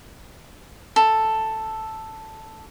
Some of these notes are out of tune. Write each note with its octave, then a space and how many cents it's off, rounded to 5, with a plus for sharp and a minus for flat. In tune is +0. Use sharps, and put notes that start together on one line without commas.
A4 +0